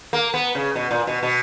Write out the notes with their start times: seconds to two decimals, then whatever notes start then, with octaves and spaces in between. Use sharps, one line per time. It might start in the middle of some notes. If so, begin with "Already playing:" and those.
0.13 A#3
0.34 B3
0.55 C#3
0.75 B2
0.91 A#2
1.07 B2
1.23 B2